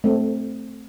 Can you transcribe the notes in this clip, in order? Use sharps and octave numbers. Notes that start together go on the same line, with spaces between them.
A3 C4